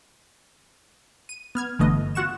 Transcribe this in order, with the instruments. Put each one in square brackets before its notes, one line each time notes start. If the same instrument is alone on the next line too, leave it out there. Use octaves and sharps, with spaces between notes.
[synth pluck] D#7
B3 F6 G#6
G1 D3 E3 A3 B3 D#5
F4 F#4 F#5 C#6 E7